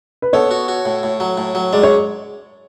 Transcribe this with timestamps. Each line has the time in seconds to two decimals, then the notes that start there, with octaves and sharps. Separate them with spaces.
0.22 B4
0.33 B3 A4 C#5
0.51 F#4
0.68 F#4
0.85 A2
1.03 A2
1.20 F#3
1.38 A2
1.55 F#3
1.73 G#3 D5
1.83 C#5